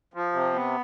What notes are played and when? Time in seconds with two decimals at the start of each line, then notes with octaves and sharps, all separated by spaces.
0.14 F3
0.33 C3
0.53 B3